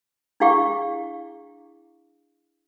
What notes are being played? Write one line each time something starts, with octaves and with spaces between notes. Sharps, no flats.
D4 E4 G#4 F5 G5 C#6